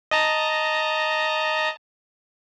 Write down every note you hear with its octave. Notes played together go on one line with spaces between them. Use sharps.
D#5 A5 A#5